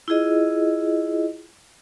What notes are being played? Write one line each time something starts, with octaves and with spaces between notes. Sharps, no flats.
E4 F4 G#4 D#5